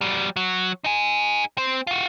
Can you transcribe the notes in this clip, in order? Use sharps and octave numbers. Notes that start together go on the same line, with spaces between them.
F#3 G3
F#3
D#4 G#4
C4
F4 F#4